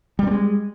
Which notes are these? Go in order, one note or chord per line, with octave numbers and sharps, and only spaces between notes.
G3 G#3 A#3 C4